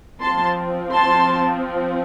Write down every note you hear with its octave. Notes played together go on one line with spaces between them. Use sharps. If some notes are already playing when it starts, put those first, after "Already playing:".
F3 C4 A5 C6
A5 C6